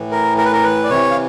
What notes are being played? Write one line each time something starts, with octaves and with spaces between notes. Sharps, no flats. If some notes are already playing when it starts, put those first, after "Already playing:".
Already playing: A2 E3
A#4
A#4
B4
A#4
B4
D5
C3 E3 C#5
F5